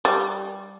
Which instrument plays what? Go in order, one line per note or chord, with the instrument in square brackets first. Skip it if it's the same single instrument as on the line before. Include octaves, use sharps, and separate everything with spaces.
[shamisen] G3